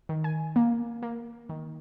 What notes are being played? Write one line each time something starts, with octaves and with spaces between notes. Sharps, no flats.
D#3
G#5
A#3
A#3
D#3